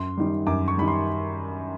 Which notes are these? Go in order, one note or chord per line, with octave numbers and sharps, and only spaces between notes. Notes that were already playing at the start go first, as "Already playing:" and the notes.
Already playing: F#2 C6
D#3 G3
F#2 D6
C#6
D#3 G3 B5
C6